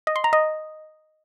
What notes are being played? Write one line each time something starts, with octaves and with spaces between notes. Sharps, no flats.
D#5
C6
A#5
D#5